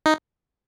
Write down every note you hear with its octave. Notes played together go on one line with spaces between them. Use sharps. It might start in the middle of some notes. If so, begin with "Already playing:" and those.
D#4